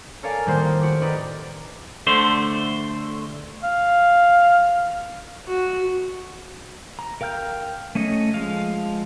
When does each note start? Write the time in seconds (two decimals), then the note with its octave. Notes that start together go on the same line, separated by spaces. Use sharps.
0.23 A4 A#4 C#5 D5 F5 G#5
0.46 A2 D#3 G3 A#3 C5 C6
0.81 F#4 G4
1.02 G4 A#4 B4 D5 D#5
2.07 D3 A3 C5
3.64 F5
5.46 F#4
6.99 A#5
7.21 A#4 F5 G5 F6 G6
7.95 A3 C#4 C#5 D#5
8.34 F3 G#3 F5